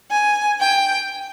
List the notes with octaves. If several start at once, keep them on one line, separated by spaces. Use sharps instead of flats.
G#5
G5